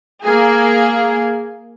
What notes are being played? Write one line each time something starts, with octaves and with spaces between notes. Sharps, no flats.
A#3 G#4